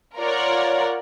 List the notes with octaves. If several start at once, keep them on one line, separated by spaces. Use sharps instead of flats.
F4 A#4 C#5 D5 F#5